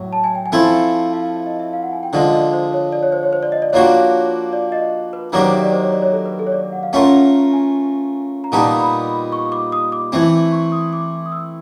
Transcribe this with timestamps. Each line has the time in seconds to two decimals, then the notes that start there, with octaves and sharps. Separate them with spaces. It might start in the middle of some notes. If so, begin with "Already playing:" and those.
Already playing: A2 F#3
0.13 A5
0.24 G#5
0.35 G5
0.46 G#5
0.52 F3 A3 C4 E4 A4
1.13 F5
1.36 E5
1.46 D#5
1.60 E5
1.73 F5
1.83 F#5
1.93 G#5
2.03 G5
2.13 D3 F3 G#3 D5
2.25 D#5
2.32 D5
2.53 C5
2.73 C#5
2.92 D5
3.03 C#5
3.12 C5
3.23 C#5
3.33 C5
3.43 D5
3.52 D#5
3.62 D5
3.73 F3 A#3 D4 F#4 C#5
4.53 D5
4.72 D#5
5.13 B4
5.33 D#3 F#3 A#3 D4 G4 B4
5.42 C5
5.53 E5
5.63 D5
5.72 C5
5.83 C#5
5.93 D5
6.02 C#5
6.12 A4
6.26 B4
6.39 A4
6.47 C#5
6.52 D5
6.72 F#5
6.83 F5
6.93 A3 C#4 F4 A#4 F#5
7.53 G#5
8.44 A#5
8.52 A#2 G3 B3 D#4 A5
8.66 A#5
8.79 B5
9.32 C#6
9.52 D6
9.72 D#6
9.92 D6
10.12 E3 A3 C4
10.52 C#6
10.72 D#6
10.93 D6
11.26 D#6
11.32 E6